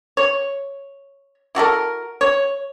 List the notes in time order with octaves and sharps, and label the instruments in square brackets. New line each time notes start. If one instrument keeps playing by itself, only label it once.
[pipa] C#5
E4 F#4 A4 A#4
C#5